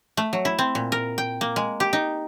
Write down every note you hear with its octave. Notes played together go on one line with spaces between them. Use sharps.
A3
F#3
E4
C4
A#2
A#4
G5
A#3
G#3
G4
D#4